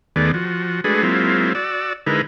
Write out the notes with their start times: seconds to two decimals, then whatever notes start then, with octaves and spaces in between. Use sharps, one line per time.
0.16 D#2 D#3 A3 B3 G#4 D5
0.34 F3 F#4
0.84 G#3 A3 D4 F#4 G#4 B4
1.03 F#3 G#3 A#3 C4 E4 F4
1.55 F#4 D5 E6
2.06 D3 G#3 D#4 E4 A#4 B4